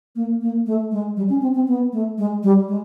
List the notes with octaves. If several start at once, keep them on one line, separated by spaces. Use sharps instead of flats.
A#3
A#3
A3
G#3
G3
C#4
C4
C4
B3
A3
G#3
G3
G#3